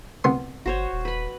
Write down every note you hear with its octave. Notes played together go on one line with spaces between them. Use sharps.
C2 B3 C6
G1 F#4 C5 C#5
D#1
B4 B5